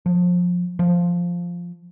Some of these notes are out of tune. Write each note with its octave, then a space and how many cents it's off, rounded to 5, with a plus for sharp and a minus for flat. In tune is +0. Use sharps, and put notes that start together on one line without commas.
F3 +25
F3 +0